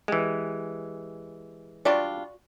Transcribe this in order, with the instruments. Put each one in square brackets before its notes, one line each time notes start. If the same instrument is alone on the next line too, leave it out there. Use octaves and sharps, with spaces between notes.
[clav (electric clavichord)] E3 G#3 [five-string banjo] G4
[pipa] G3 D4 F4 [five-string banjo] F#4 D5